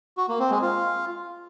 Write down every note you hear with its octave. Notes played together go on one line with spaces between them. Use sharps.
F#4
A#3
C4
G#3
F4